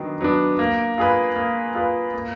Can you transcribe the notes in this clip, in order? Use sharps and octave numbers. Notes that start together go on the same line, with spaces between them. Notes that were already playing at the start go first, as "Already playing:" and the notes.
Already playing: D#3 F#3 B3 D4
F#3 B3 D4
A#3
F4 G#4 B4
A#3
F4 G#4 B4
A#3